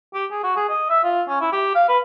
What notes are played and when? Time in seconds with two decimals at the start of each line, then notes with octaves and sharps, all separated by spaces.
0.14 G4
0.31 G#4
0.44 F#4
0.56 G#4
0.69 D#5
0.90 E5
1.03 F4
1.28 C#4
1.41 E4
1.53 G4
1.75 F5
1.89 B4